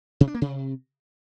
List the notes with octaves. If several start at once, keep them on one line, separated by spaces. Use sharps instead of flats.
C3
D4
A#3
C3